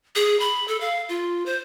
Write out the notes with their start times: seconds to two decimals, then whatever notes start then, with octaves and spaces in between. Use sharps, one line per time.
0.16 G#4
0.40 B5
0.68 A4
0.80 F5
1.09 F4
1.46 C5